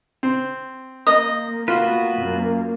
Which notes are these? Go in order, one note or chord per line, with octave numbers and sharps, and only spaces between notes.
C4
A#3 D#5
B3 F4 F#4 B4
F#2 A#3